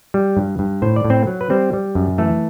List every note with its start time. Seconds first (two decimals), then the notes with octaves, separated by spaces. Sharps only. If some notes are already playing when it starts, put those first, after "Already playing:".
0.14 G3
0.37 G2
0.59 G2
0.82 A2 C5
0.96 D5
1.05 A2
1.10 C4 C5
1.27 F#3
1.41 B4
1.50 G3 C4 C5
1.73 G3
1.95 F#2
2.18 E3 A3 A4